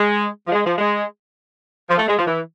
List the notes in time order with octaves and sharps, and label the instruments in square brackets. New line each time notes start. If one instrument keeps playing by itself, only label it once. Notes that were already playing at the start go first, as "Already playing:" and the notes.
Already playing: [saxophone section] G#3
F3
G#3
F3
G#3
F3
A3
G#3
F3
E3